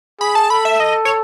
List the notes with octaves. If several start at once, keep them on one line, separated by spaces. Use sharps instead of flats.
G#4 B5
A5
A4 B5
E5
D#5
C#5